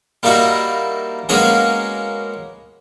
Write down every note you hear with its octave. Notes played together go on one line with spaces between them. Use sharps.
G3 A#3 D#4 E4 F#4
G#3 A#3 B3 C#4 F#4 G#4